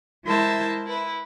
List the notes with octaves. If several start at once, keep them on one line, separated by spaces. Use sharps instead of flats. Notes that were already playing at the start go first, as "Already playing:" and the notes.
G#3 E4 A#4 C5 E5 A5
E4 B4